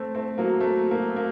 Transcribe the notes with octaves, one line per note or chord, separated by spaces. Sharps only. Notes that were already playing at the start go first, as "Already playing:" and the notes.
Already playing: A3 C4
A3 C4
F#3 A#3
A3 C4
F#3 A#3
A#3